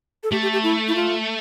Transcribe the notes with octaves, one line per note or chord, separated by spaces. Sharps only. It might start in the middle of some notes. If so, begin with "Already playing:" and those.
A4
A3 G4
G4
G4
E4
E4
F4